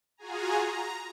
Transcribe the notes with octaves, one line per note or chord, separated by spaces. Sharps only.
F4 F#4 G#4 G#5 A#5
A#5